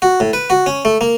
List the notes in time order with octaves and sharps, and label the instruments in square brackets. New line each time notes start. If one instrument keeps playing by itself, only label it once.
[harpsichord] F#4
A2
B4
F#4
C#4
A3
A#3